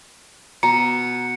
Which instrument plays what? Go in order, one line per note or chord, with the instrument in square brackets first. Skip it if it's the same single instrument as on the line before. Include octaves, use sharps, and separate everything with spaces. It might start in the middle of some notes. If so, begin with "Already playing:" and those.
[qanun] B2 [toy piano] A#5 [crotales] C#7